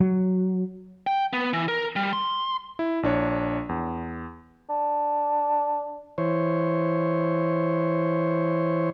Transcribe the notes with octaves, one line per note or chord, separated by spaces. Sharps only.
F#3
G5
B3
E3
A#4
G3
C6
E4
A#1 D4 C#5
E2
D4
E3 C5 C#5